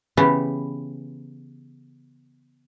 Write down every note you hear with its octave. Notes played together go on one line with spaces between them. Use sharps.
C#3 E3 B3 C#4 G4